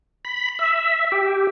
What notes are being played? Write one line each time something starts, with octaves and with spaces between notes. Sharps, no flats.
B5
E5
G4